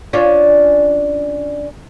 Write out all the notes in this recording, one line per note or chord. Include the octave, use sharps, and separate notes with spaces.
C#4 D4 F4